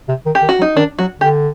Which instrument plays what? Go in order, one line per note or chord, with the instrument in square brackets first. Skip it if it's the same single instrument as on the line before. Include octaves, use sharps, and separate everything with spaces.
[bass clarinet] C3
D#3
[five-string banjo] G4
[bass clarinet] D#3
[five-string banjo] F#4
[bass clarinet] F#3
[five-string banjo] D#4
[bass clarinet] D#3 [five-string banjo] D4
[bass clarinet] F#3 [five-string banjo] F#4
[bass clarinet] D3 [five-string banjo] G4